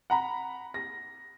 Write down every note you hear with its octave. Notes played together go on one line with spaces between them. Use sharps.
F#5 A#5 B5
A#6